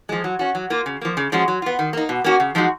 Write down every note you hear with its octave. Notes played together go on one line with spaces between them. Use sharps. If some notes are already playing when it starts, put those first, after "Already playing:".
F3 G#3
F#3
C#4 F#4
F#3
A#3 F4
C#3
F3 A#3
C#3
F3 G#3 C#4 F#4
F#3
B3 F4
D#3
A#3 D#4
B2
A#3 C#4 F#4
C#3
F3 G#3 D#4 F#4